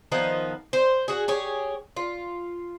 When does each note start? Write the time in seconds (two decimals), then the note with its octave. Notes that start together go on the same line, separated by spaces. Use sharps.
0.12 D#3 F3 B3 D#4
0.73 C5
1.08 F#4 G#4
1.28 G4 G#4 C#5
1.96 F4